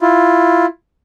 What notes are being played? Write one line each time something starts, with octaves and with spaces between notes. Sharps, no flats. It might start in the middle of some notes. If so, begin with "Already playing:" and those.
E4 F4